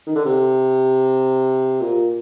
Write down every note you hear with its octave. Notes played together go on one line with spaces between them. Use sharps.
D#3
D3
C3
A#2